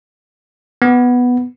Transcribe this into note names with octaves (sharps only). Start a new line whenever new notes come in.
B3